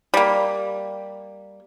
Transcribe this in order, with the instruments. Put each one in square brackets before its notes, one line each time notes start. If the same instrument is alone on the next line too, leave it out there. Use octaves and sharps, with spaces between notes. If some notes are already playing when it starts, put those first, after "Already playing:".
[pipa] G3 A#3